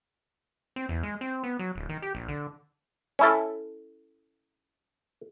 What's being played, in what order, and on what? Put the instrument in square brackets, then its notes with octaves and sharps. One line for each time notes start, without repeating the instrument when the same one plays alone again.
[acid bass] C4
E2
G#3
C4
B3
F#3
D1
D#3
G4
A#1
D3
[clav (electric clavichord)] C#4 E4 A4